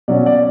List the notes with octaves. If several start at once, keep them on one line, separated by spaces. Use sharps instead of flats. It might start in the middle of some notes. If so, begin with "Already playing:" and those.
B2 F#3 C#4 D5
D5